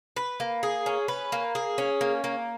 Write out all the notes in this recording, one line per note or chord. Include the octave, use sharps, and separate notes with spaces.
B4
A#3
G#4
C#4
B4
A#3
G#4
C#4
A#3
A#3